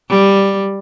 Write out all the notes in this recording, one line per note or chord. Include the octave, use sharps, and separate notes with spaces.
G3